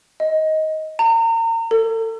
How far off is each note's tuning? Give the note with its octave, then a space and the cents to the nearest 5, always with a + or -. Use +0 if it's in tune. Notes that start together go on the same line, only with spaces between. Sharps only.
D#5 +15
A#5 -35
A4 +35